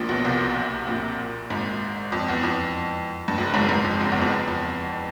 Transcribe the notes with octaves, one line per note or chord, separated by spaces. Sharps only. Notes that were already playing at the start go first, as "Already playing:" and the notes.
Already playing: A#1 A#2
B1 B2
C2 C3
A#1 A#2
G#1 G#2
F2
E2
F2
G2
F#1 F#2
G#1 G#2
G#1 G#2
F2
F#1 F#2
E2
F2
E2
F2